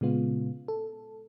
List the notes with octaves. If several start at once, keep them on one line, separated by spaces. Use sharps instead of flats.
A#2 C#3 G#3 B3 F4
A4